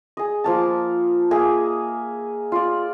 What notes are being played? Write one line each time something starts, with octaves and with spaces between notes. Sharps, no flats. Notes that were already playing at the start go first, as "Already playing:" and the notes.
G#4 D#5
F3 A#3 A5
A#3 G#4 D#5 E5
F4 D5